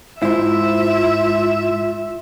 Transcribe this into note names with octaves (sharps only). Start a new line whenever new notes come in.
G#2 E4 F4 C5 E5